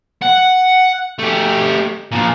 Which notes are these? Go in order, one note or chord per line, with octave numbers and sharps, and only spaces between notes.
F#5
A3 G4
A#2 F3